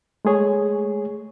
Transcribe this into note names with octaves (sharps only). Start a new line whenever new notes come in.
G#3 A3 G#4 C#5